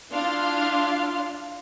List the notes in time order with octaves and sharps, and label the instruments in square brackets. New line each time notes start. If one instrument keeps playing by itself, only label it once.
[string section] D4 E4 F4 F5 C6